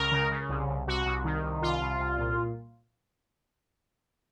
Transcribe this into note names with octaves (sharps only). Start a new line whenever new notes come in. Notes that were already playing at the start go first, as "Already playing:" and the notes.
Already playing: C#2 A#4
C#3
C#3
C2
C2
C2 F#4
C2
D#3
C2
C2 F4
C2
C2
A#2